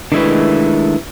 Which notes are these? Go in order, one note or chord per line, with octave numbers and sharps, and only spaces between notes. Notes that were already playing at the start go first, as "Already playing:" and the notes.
D#3 G#3 A3 D4 E4 B4